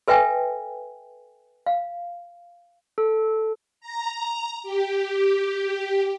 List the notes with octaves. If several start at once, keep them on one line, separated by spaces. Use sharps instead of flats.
A4 B4 E5 G5 G#5
F5
A4
A#5
G4